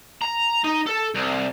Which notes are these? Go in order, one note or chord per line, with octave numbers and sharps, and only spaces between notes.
A#5
D#4
A4
C2